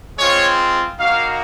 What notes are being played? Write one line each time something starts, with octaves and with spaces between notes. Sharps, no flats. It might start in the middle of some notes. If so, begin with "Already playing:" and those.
G#3 C4 F4 C#5
A#3 D#4 F#4 F5